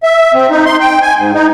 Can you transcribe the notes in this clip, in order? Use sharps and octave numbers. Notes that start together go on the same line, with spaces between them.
E5
C4
D#4
C6
G5
G#5
G#2
D#4